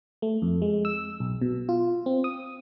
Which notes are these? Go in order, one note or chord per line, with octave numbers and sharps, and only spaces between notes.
A3
F2
G#3
E6
B1
B2
F4
C4
D#6